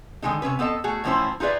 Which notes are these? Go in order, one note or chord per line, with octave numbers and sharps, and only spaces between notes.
D3 D#3 G#3 A3 D#4
C3 F#3 C#4 B4
B3 C4 A4 D#5 A5
A3 F#4 G#4
A2 E3 F3 C#4 E4 C5
D#4 F4 G#4 B4 D5 E5